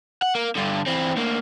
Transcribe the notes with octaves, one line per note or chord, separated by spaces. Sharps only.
F#5
A#3
G2 D3
E3 C4
D2 A#3